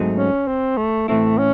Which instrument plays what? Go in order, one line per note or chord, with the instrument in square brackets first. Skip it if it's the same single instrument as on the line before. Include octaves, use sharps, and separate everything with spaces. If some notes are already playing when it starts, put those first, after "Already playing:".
Already playing: [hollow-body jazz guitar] G#2 F#3 A3 C4 D#4
[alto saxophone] C#4
C4
A3
[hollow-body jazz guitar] A2 E3 C4 E4 [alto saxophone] A3
[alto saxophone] C#4